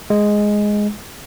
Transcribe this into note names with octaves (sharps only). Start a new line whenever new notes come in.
G#3